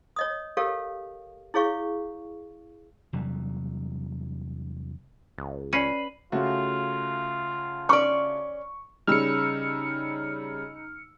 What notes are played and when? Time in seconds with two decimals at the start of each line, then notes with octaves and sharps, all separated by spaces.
0.16 C#5 D#5 D#6
0.57 G4 A4 A#4 C#5 F5
1.54 E4 G#4 C#5 F5 C#6
3.13 E2 C3 F#3 G3
5.38 C#2
5.73 C#4 B4 D5 C7 D#7
6.32 C#3 A3 F4 F#4
7.89 C#4 D5 C#6
9.07 C#3 G3 D#4 E6 F6 C#7